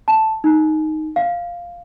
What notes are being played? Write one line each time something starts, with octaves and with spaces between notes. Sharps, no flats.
A5
D#4
F5